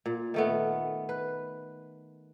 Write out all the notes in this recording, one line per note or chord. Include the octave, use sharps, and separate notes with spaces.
A#2
D#3 A3 B3
B4